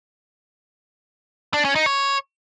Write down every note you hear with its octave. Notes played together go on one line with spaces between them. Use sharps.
D4
C#4
D#4
C#5